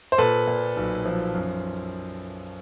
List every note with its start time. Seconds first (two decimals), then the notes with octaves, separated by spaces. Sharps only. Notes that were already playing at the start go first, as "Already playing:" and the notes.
0.12 C5
0.18 A#2 A4 B4
0.47 A#2
0.76 B1
1.05 F3
1.35 F#2